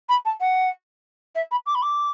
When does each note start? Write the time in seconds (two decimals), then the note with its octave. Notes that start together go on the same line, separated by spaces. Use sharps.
0.09 B5
0.25 A5
0.40 F#5
1.35 E5
1.51 B5
1.66 D6
1.75 B5
1.82 D6